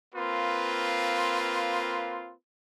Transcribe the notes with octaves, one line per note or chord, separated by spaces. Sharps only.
A#3 C4 F4 B4